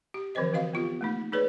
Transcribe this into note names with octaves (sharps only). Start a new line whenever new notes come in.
G4
D3 E3 F3 C4 C5 D#5
E3 C4 F#4 D#5 F5
B3 F4 G4
A3 A#3 D#4
D#4 G#4 B4 C#5 D5